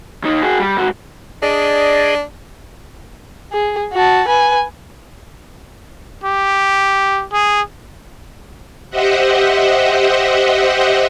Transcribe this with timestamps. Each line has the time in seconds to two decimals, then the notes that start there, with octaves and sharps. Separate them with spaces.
0.24 D#2 D#4
0.42 F#4 G#4
0.60 G3
0.77 G#2 F#4
1.42 D4 G#4 D5 D#5
3.52 G#4
3.93 F#4 A5
4.28 B4 G#5
6.24 G4
7.32 G#4
8.90 G4 C5 D#5 E5 F#5